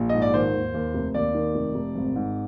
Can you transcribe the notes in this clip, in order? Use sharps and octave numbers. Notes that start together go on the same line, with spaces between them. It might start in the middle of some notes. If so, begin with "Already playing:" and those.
Already playing: A#1
G#2 D#5
D5
D#3 C5
D#2
D#2
F1
D#2 D5
D#3
F1
F1
G#1
G#2